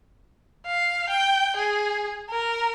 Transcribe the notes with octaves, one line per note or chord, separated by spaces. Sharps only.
F5
G5
G#4
A#4